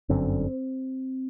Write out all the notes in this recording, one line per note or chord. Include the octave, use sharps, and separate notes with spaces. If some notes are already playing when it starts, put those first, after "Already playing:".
G1 F#2 D3 C4